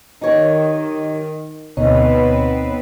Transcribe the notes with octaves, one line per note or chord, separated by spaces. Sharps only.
D#3 D#4 G4 C#5
D2 B2 B3 C4 D#4 B4 C#5